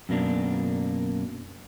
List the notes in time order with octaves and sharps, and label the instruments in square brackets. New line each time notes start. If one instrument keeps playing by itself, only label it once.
[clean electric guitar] F#2 B2 A#3 D4